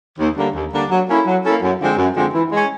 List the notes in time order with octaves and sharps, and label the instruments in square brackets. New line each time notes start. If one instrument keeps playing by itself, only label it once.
[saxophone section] D#2
D3 G3 A#3 D4
D#2
D3 G3 A#3 D4
F#3
A#3 C#4 E4 A4
F#3
A#3 C#4 E4 A4
F#2
D3 F3 G#3 C4
F#2
D3 F3 G#3 C4
E3
G#3 C#4